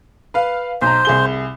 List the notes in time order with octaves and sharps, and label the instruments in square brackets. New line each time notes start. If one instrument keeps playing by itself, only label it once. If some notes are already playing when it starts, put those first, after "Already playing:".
[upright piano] B4 F5
[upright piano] B1 A#5 [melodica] C5
[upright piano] C2 G#4 G7